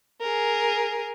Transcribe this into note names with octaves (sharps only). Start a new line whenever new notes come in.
G#4 A#4